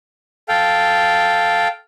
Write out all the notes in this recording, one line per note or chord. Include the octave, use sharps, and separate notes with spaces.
A4 F5 G5